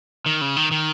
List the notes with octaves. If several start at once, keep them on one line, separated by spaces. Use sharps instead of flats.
D#3
C#3
D#3
D#3